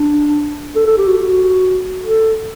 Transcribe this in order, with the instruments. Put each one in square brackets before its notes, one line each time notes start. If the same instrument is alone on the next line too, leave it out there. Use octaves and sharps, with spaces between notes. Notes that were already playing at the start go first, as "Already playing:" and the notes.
Already playing: [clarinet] D4
A4
A4
G4
F#4
F#4
A4